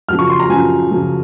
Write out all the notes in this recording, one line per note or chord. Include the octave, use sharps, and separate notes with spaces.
F#2 C#3 F3 F6
C#6
C6
A#5
F#2 C#3 F3 G#5
F#2 C#3 F3